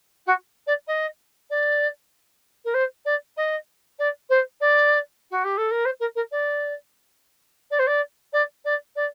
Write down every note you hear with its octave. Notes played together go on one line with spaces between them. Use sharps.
F#4
D5
D#5
D5
A#4
C5
D5
D#5
D5
C5
D5
F#4
G4
A4
A#4
C5
A#4
A#4
D5
D5
C5
D5
D5
D5
D5